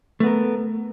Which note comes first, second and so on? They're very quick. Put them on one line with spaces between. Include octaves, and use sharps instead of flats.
A3 B3 A#4